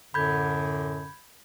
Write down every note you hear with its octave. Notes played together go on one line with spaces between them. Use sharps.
F#2 A2 D3 B5 G6 G#6